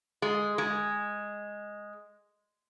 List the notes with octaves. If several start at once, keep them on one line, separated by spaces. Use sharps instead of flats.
G#3
G#3